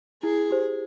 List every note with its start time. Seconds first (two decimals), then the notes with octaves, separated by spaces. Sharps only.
0.23 E4 G#4
0.51 G4 C5